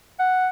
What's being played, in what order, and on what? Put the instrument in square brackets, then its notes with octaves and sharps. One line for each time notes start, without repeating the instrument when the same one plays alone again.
[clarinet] F#5